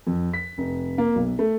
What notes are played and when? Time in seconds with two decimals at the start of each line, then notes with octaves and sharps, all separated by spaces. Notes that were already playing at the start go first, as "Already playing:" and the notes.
0.07 F2
0.34 B6
0.58 F1
0.98 A#3
1.15 B1
1.39 A3